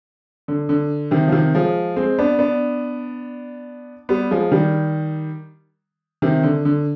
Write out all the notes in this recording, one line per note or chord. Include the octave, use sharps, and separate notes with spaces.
D3
D3
C3 D#3
F3
C3 D#3
F3 G#3
G#3 C4
B3 D4
B3 D4
G3 B3
F3 G#3
D#3 G3
C3 D#3
D3
D3